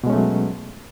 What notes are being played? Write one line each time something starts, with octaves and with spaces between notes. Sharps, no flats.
B2 F#3 G#3 A3 C#4